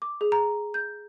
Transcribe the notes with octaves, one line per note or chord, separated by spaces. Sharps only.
D6
G#4
A#5
G6